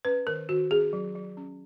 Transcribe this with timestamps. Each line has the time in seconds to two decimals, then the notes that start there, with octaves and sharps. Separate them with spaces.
0.05 C#4 B4
0.27 D#3 A#4
0.49 D#3 F#4
0.71 C#4 G#4
0.93 F#3
1.15 F#3
1.37 C#4